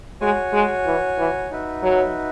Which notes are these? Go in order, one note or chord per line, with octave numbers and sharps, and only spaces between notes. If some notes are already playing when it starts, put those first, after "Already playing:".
G#3 F#4 C#5 G#5
G#3
E3
E3
D#4 F#4 B4 E5
F#3